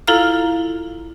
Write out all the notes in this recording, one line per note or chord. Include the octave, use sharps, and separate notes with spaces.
E4 F4 A4 F5 A#5 F6